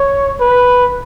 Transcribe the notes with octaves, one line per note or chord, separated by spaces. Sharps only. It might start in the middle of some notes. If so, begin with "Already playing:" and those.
Already playing: C#5
B4